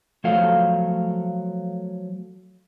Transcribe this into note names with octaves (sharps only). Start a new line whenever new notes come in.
F3 F#3 A3 A4 F5